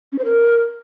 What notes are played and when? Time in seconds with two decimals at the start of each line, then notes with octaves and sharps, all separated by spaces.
0.12 C#4
0.18 C5
0.25 A#4